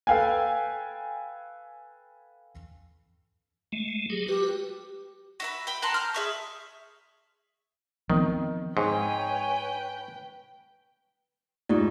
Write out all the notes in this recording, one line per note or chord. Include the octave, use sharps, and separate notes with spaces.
A4 B4 F5 G5 G#5
G#3 A3
F#3 G4 G#4
F#4 G4 B4
F#4 E5 B5
G5 B5
F#5 A5 A#5 C6
F6 G6
G#4 E5 C#6
D#3 F3 B3 C4
G#2 B4 C#5 G5 G#5 C#6
G#2 F4 G4 D5